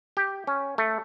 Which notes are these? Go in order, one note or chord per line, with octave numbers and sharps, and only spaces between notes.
G4
C#4
A3